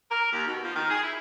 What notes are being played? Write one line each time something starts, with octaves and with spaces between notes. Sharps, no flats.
A#4
D#2
B2
F3
D#3
G#4
E4